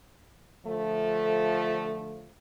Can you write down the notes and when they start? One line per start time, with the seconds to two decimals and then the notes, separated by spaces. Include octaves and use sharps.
0.66 D3 F3 A3